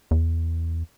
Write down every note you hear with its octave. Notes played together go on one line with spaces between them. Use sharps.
E2